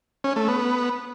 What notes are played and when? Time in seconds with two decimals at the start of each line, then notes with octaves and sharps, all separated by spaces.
0.24 C#4
0.36 A3
0.48 B3